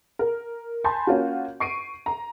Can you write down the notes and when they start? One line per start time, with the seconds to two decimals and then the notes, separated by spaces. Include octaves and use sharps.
0.19 A#4
0.84 G#5 A5 B5 C6 G6
1.07 A#3 C#4 F4 F#4
1.60 C#6 C7 D7 D#7
2.06 A#5